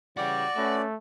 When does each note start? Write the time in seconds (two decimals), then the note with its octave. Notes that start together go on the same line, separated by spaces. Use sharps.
0.17 C#3 E3 G3 F#4 D5
0.57 A3 C#4 B4